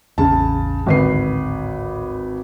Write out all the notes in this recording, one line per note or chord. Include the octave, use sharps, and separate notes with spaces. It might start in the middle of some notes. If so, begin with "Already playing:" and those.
A1 E2 C#3 A5
D1 G#1 D3 B4 C7